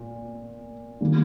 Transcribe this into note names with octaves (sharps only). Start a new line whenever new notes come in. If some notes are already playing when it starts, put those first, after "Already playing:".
Already playing: A#2
D#3 G3 A#3